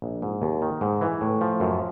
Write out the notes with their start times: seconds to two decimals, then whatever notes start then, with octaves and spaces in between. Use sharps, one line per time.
0.02 A#1
0.22 G#2
0.42 D#2
0.62 D#3
0.81 G#2
1.01 E3
1.21 A2
1.41 F3
1.60 F#2